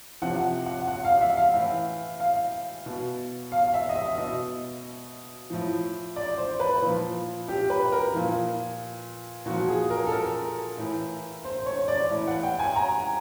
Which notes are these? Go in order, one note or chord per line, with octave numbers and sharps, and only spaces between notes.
C3 F3 F#5
F#5
F#5
F5
E5
F5
A2 E3
F5
B2
F5
E5
D#5
E5
B2 D#5
A2 F3
D5
C5
B4
A#2 F3
G4
B4
A#4
A#2 F3
A#2 F3 F#4
G#4
A#4
A4
A#4
A2 E3
C5
C#5
D5
A2 E3
F#5
G5
G#5
A#5